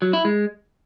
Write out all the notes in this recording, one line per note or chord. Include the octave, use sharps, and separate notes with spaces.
F#3
E4
G#3